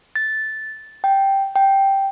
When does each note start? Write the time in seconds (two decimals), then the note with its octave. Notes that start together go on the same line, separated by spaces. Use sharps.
0.16 A6
1.04 G5
1.55 G5